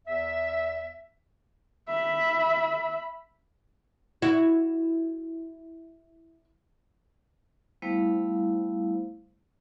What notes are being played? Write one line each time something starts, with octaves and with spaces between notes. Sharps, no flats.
E2 E5
E5 B5
E4 F#4
G3 A3 B3 E4 C5 F5